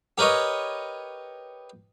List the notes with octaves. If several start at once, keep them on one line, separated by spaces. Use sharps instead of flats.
G4 A#4 B4 C#5 D#5